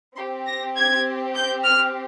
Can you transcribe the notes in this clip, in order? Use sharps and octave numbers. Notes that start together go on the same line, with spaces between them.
C4 G4 C6
A#6
G#6
G6
F6